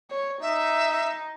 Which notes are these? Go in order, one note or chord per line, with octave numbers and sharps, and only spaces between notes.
C#5
D#4 E5